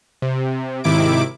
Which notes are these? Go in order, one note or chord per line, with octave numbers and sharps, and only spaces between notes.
C3
G#1 C3 D#3 E4 D6 D7